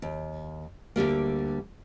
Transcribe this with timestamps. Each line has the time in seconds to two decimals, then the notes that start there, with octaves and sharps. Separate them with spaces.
0.02 D#2
0.96 D2 D3 G3 A#3